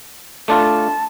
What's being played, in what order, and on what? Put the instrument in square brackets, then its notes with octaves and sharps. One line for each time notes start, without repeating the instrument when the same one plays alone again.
[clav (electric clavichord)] A3 D4 F4 [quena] A5